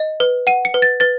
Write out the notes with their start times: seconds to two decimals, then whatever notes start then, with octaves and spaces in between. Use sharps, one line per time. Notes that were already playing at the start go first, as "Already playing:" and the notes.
Already playing: D#5
0.20 B4
0.47 F#5 D#7
0.65 C#7
0.74 B4
0.82 A6
1.00 B4 A6